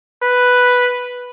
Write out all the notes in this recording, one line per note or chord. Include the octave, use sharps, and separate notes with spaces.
B4